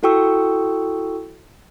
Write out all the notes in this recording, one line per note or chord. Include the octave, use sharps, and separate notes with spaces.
E4 F#4 A4 G5 C#6 E6